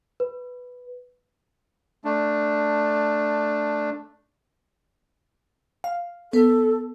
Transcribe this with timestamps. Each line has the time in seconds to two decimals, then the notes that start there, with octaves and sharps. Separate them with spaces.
0.20 B4
2.05 A3 D4
5.84 F5
6.33 B3 A4